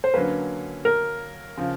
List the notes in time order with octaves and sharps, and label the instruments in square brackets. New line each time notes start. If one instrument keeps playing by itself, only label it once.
[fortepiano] C5
[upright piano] D3 F#3 A#3 C#4 [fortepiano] B4
[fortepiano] A#4
[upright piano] C#3 F3